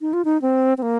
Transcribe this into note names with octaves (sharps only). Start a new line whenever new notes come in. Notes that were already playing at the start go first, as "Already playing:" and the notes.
D#4
F4
D#4
C4
C4
A#3